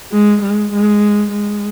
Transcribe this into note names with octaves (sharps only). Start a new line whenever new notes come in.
G#3
G#3
G#3
G#3